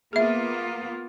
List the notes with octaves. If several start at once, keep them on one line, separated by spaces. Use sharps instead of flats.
A#3 B3 F4 G#4 E5